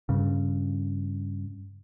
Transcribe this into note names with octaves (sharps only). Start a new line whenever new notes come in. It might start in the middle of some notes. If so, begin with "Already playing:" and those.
G2 C#3